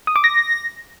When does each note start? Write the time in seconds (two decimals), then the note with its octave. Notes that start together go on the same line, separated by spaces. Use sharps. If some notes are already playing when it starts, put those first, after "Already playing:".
0.07 D#6
0.16 D6
0.24 A#6